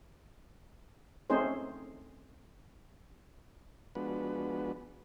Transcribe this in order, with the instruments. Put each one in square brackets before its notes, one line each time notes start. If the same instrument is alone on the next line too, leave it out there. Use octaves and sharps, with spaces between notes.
[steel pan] A3 C4 C#4 D#4 G#4 C5
[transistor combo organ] F3 G#3 B3 D4 F#4 B4